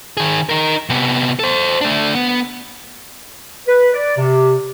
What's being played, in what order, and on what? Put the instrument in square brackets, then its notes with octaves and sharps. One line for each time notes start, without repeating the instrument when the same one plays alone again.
[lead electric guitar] D#3 G#4
D#4 A#4
C3 B3
A4 C5
A3 D4
B3
[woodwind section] B4
D5
C3